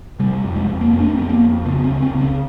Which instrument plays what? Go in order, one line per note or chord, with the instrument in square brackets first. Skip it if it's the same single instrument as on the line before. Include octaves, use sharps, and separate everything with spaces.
[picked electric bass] C3 G3
F2
G#3
F2
A#3
F2 A3
D4
C#4
F2 C4
B3
A#3
F2
C#3 B3
C4
C#2
C4
C#3
C#4